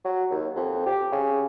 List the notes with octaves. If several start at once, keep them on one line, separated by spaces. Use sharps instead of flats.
F#3
D#2
F2
G4
C#3